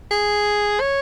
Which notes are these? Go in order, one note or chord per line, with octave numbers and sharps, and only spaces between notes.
G#4
C#5